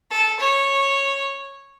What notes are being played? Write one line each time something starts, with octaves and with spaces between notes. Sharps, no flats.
A4
C#5